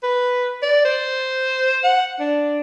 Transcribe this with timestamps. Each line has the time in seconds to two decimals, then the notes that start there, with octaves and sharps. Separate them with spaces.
0.03 B4
0.62 D5
0.85 C5
1.84 F#5
2.20 D4